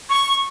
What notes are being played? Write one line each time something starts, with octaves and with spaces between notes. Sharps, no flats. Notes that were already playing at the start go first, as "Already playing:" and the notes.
C#6